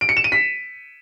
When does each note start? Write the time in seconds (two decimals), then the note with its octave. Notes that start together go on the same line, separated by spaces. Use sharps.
0.01 D7
0.09 C#7
0.17 E7
0.24 D#7
0.32 B6